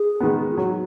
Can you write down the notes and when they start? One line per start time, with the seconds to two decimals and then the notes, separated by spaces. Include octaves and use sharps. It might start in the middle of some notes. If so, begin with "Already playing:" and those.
Already playing: G#4
0.20 D#3 G#3 B3
0.51 F4
0.57 F#3 F#4